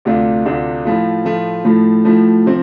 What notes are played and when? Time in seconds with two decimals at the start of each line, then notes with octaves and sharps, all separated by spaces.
0.05 D2 C3 A3 D4 F4
0.45 D2 C3 A3 D4 F4
0.85 A2 F3 A3 F4
1.25 A2 F3 A3 F4
1.65 A2 F3 A3
2.05 A2 F3 A3
2.46 C3 F3 C4